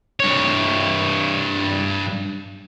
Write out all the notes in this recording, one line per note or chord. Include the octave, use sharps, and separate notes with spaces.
G2 C#5